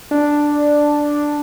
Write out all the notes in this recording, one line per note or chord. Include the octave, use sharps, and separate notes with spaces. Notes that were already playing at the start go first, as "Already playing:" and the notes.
D4